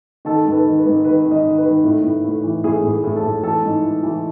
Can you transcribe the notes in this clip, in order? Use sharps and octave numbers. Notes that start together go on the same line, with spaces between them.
D#3 A4
G#2 A4
B4
D#3
B4
G#2
D#3 B4
D#3
D#5
D#3
B4
D#3
A2
A2
A2
E3
A2 G#4
A2
G#4
A2
A4
A2
E3 A4
G#2
E3
E3